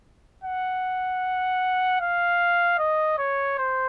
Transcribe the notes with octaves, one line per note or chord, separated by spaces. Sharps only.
F#5
F5
D#5
C#5
C5